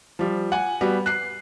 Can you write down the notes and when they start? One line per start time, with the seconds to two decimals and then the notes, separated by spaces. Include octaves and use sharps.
0.19 F3 G3
0.52 F#5 G#5
0.81 G3 B3 F#4
1.06 F#6 C7